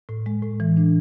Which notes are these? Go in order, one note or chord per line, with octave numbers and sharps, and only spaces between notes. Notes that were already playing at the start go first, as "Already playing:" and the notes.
A2
G#3
A2
E3
D4